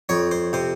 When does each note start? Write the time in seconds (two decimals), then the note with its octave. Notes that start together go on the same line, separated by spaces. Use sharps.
0.09 F2 C#5
0.31 C5
0.53 C3 C5